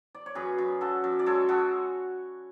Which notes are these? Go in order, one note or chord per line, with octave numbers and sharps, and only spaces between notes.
D5
C#5
F#2 G#4 B4
F#2
F#2 F#4 A4
F#2
D5
G#3 A4 C#5
G#3 F#4 A4